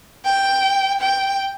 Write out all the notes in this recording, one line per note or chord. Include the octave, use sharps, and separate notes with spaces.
G5
G5